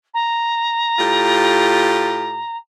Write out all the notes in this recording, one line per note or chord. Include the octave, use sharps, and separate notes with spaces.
A#5
A2 F4 G4